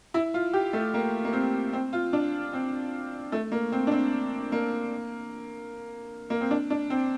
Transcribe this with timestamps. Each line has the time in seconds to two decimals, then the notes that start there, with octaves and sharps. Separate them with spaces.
0.14 E4
0.34 F4
0.53 G4
0.73 A3
0.94 A#3
1.25 A#3
1.33 C4
1.73 C4
1.93 F4
2.13 D4
2.53 C4
3.32 A3
3.52 A#3
3.72 C4
3.87 D4
3.91 C4
4.52 A#3
6.30 A#3
6.41 C4
6.51 D4
6.70 D4
6.90 C4